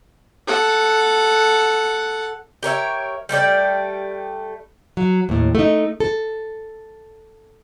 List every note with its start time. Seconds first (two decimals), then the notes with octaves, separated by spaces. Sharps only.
0.47 A4 F#5
2.63 G4 A#4 C#5 E5
3.29 G3 A3 G4 D5
4.97 F#3
5.29 D#2 A2
5.55 A3 D#4
6.00 A4